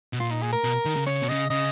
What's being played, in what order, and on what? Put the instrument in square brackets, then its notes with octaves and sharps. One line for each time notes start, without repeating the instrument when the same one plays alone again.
[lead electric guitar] B2
[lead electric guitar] A#2 [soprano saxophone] F4
[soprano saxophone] D#4
G#4
A#4
[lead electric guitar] B2
D#3
C#3
[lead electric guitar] C#3 [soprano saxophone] C#5
[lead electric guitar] B2
[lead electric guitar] C#3 [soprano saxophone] D#5
[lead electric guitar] C#3 [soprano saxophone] D#5